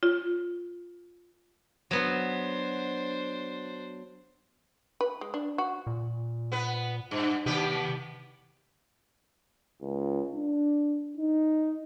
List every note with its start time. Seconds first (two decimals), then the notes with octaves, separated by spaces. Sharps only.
0.03 F4
1.91 F#3 B3 D4 C5
5.01 B4
5.21 G#3
5.34 D4
5.58 F#4
5.87 A#2
6.52 B3 B4
7.11 G2
7.46 D#2 C3 B3 G4
9.81 C#2
10.34 D4
11.17 D#4